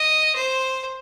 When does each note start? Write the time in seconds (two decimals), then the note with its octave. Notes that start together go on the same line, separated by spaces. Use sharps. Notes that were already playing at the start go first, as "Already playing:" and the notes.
Already playing: D#5
0.35 C5